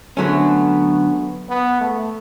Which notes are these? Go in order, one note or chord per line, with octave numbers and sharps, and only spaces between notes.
D3 F#3 A3 B3 C#4
B3
A3